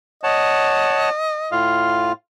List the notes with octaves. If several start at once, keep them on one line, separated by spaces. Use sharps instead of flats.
C#5 D#5 F#5 A5
A2 F4 F5